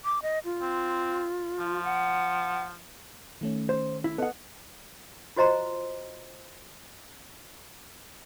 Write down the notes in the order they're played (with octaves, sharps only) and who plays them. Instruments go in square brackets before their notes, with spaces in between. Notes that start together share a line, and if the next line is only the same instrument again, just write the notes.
[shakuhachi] D6
D#5
F4
[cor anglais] C4
F3
[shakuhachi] F#5
[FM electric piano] D#3 A3 C#4
[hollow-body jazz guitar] C5
E4
[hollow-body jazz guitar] B3 F#5 [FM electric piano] A4 D#5
[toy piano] F4 F#4 C5 D#5 A#5 C6